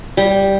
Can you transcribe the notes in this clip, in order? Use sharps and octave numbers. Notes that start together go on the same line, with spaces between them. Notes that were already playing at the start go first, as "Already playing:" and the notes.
G3